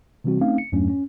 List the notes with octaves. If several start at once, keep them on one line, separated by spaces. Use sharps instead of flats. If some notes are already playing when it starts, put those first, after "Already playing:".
C3 E3 G3 C4 F#4
A3 C4 C#4 D#4 F5
C#7
E2 G2 F#3 A3 C#4 D4
C#4